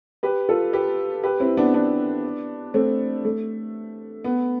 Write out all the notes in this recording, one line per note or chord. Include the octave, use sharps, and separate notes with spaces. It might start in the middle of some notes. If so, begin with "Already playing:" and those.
G4 B4
F4 A4
G4 B4
G4 B4
C4 E4
B3 D4
B3 D4
A3 C4
A3
B3